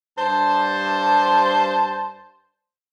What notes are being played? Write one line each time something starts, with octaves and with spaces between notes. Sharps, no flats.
G2 C5 A5